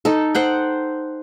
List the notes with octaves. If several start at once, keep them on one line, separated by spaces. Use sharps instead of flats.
D#4 A4
C5 F#5 G5